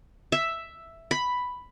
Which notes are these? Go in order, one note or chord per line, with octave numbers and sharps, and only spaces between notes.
E5
B5